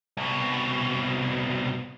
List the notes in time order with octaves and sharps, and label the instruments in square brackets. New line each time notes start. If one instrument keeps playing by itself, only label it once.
[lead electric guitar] C2 B2